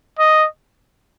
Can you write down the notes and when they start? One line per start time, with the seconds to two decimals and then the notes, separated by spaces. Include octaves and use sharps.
0.19 D#5